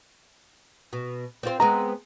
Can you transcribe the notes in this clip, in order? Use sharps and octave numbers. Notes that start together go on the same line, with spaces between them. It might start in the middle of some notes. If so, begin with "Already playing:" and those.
B2
C4 F4 C5
G#3 B3 C4 A#5